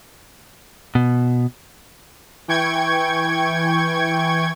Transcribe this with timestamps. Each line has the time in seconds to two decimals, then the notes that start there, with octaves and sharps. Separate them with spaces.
0.95 B2
2.48 E3 G5 C#6 G#6